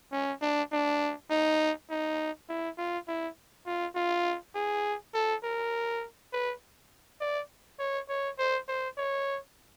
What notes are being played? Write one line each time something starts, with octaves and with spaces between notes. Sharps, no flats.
C#4
D4
D4
D#4
D#4
E4
F4
E4
F4
F4
G#4
A4
A#4
B4
D5
C#5
C#5
C5
C5
C#5